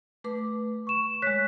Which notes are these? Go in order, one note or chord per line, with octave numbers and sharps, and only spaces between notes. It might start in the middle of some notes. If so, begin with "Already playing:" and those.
A3 B4 D6
C#6 E7
G#3 C#5 F#6 B6